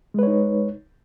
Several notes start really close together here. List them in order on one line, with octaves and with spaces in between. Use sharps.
G#3 B4 C#5 D#4